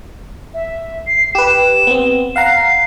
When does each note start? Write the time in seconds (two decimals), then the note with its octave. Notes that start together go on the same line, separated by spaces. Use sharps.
0.54 E5
1.07 C7
1.35 G4 B4 E7
1.87 B3 C4
2.36 F5 F#5 A#5 C7